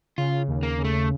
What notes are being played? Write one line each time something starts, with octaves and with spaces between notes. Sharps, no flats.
C#3 F4
D#2
A#3
C#3
A3